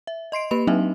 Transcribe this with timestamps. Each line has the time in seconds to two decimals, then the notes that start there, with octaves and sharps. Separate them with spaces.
0.07 E5
0.32 D#5 C6 C7 D7
0.51 A#3 G4 B4 B5 F7
0.67 F#3 C4 D4 D#4 D#5 E5